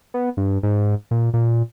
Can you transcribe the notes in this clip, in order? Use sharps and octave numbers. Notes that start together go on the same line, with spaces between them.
B3
G2
G#2
A#2
A#2